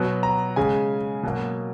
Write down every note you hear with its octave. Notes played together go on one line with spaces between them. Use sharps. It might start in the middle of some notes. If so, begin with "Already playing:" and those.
Already playing: B2 F#3 B3
A#5
C#3 G#3 C#4 G#5
B2 F#3 A#3